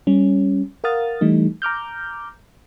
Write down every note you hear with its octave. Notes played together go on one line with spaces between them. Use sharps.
G3 C#4
A#4 F5 F#5 D#6 F6 A6
E3 G3 A3 D#4
A#5 D6 F6 G6